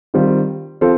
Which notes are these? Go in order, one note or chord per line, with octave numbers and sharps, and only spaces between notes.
D#3 G3 C4 F4
F3 C4 F4 A4 C5